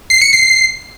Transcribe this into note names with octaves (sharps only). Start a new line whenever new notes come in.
C7
C#7
C7